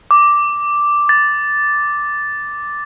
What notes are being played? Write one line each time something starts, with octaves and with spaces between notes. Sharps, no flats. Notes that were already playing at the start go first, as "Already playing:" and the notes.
D6
A6